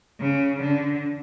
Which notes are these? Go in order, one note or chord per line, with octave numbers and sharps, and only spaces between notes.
C#3
D3